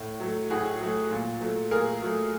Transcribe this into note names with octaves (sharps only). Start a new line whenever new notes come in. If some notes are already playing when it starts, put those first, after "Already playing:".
Already playing: A2
F#3 A3
A2 F#4 G#4
F#3 A3
A#2
F#3 A3
A#2 G#4 A#4
F#3 A3